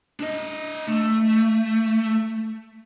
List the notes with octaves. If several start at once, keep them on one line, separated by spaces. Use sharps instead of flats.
D4 D#5
A3